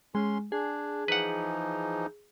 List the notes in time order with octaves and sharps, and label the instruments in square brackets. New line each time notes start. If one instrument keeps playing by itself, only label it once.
[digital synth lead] G#3 [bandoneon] C#4 C6
[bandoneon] D4 [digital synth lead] G#4
[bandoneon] E3 F3 D#4 [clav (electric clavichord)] B4 F#5